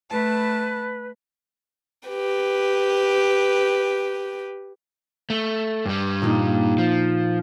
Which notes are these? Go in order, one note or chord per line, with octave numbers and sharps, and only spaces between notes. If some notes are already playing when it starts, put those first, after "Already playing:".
A3 B4 A5
G4 B4
A3
G2 G3
A#2 A#3 D#4
F3